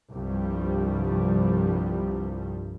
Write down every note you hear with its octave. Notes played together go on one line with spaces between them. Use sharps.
C2 G2 F3 G3